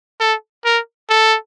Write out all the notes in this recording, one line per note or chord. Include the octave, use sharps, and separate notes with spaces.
A4
A#4
A4